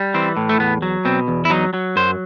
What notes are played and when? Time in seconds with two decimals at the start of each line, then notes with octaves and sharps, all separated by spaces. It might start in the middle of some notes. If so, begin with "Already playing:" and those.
Already playing: G3
0.14 E3 C4
0.37 A2
0.49 A3
0.59 E2 B3
0.82 F#3
1.05 B2 C4
1.28 E2
1.45 E4
1.50 F#3 D#4
1.74 F#3
1.96 F#2 C5